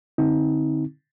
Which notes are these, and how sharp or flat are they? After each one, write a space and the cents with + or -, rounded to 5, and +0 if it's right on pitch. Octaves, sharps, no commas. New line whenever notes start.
D3 +0 C4 +0 D#4 +35